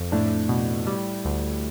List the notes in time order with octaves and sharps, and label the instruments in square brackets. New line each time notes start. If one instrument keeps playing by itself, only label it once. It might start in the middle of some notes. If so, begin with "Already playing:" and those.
Already playing: [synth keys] F2
[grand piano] A2 [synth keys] D4
[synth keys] B2
G3
D2